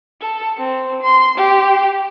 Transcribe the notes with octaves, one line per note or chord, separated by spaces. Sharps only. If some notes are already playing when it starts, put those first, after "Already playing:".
A4
C4
C6
G4